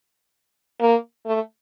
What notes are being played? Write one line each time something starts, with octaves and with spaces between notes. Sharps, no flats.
A#3
A3